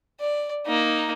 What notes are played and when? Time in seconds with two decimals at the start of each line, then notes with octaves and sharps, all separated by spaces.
0.20 D5
0.66 A#3 D#4